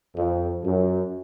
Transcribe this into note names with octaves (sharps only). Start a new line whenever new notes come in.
F2
F#2